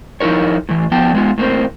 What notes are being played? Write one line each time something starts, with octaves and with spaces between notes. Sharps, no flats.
F3 D#4 E4 A#4 C#5
A2 E3
F3 B3 G5 A5
G#3 B3 F4
A2 A#3 C4